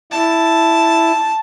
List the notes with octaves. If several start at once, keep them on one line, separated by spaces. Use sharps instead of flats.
E4 A5